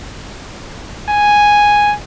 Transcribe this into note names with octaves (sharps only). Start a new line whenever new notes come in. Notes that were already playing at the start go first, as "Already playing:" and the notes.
G#5